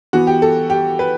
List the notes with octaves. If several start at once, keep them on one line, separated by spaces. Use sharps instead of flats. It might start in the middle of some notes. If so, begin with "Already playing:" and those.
E3 B3 F#4
G4
A4
G4
B4